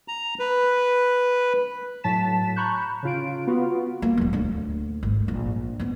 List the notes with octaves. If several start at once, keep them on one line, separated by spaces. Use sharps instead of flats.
A#5
B4
A2 F#3 A5 A6 B6 E7
A#5 B5 C#6 F#6 G6
C#3 F4 D7
B3 F4 F#4
A#3
D1 F#3
D2 D4
G#1
A#1
B3 C4